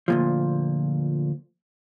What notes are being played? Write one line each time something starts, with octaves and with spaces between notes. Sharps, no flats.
D2 A#2 F3